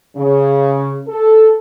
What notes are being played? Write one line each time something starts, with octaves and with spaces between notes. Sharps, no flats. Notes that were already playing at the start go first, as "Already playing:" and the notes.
C#3
A4